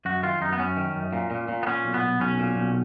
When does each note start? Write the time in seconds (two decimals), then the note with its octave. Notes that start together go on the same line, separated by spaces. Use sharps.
0.05 F#2 F#4
0.23 D#3 F4
0.41 F#2 D#4
0.53 B3
0.59 F#2 C#4
0.77 D#3
0.95 F#2
1.13 A#2
1.31 A#2
1.48 A#2
1.63 B3
1.67 A#2 C#4
1.85 B1
1.94 B3
2.03 B1
2.20 B1 C#4
2.39 A#2
2.56 B1